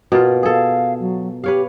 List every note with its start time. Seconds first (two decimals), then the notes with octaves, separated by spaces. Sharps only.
0.12 B2 A#3 F4
0.43 G#4 A4 F5
1.00 F#3
1.44 G4 B4 C#5 F5